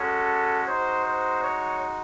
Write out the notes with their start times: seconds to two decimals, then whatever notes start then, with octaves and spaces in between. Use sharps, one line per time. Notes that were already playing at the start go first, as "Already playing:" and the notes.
Already playing: G#3 C#4 F#4 A4
0.67 G#3 D#4 F#4 C5
1.04 C5
1.42 C#5